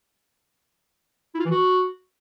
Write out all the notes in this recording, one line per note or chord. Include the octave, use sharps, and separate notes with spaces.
E4
F4
E3
F#4